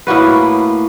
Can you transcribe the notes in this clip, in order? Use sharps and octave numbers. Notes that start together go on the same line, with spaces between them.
A2 A#3 F#4 B4